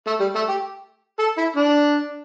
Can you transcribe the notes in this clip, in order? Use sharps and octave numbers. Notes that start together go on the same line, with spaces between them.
A3
G3
A3
G4
A4
E4
D4